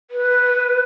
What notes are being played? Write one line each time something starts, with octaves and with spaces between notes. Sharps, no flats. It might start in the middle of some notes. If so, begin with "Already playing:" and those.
B4